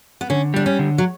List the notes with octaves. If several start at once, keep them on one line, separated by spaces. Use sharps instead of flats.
B3
D3 C#4
G3 D4
C#4
D3
F#3